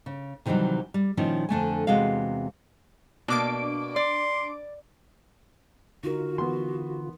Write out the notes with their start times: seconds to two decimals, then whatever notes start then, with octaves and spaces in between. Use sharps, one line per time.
0.06 C#3
0.46 C3 D#3 E3 F#3 G3
0.94 G3
1.17 A#2 D#3 F3 C#4 E4
1.49 F2 D3 A3 G#5
1.87 E2 C3 G#3 F#4 F5
3.28 B2 A#3 D4 D6 D7
3.96 D5 C6
6.04 D3 D#4 F4 F#4 A#4
6.38 E3 B3 C6